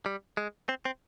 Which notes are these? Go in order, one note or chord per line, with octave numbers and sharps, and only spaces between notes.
G3
G#3
C4
C4